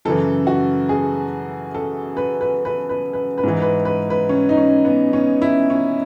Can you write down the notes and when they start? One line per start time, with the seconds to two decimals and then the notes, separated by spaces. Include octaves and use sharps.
0.05 F#2 C#3 E3 A4
0.47 F#4
0.89 G#4
1.74 A4
2.17 B4
2.41 B4
2.65 B4
2.89 B4
3.13 B4
3.38 B4
3.43 G#2 E3
3.62 B4
3.85 B4
4.10 B4
4.29 C#4
4.49 D#4
4.57 C#4
4.85 B3
5.13 C#4
5.42 E4
5.70 C#4